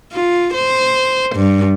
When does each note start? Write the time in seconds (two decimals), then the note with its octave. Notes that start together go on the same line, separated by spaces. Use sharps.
0.12 F4
0.54 C5
1.35 G2